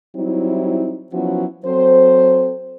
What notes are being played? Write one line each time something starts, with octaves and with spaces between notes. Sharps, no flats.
F#3 G3 C4 D#4 E4
F3 F#3 B3 C#4 E4 F#4
F#3 C4 A4 C5